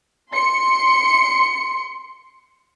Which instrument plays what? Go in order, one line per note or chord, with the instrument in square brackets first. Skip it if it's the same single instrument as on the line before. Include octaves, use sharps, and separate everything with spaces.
[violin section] C6 C#7